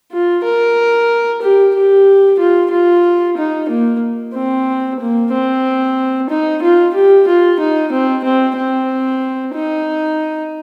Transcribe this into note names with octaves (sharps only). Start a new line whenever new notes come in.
F4
A#4
G4
G4
F4
F4
D#4
A#3
C4
A#3
C4
D#4
F4
G4
F4
D#4
C4
C4
C4
D#4